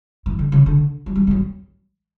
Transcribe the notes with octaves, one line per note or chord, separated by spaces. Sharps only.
E3
D3
C#3
D3
F#3
G3
E3
F#3